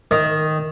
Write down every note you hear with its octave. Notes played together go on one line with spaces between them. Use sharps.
D#3